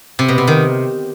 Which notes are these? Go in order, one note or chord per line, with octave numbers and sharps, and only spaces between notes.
C3
B2
C3
D#3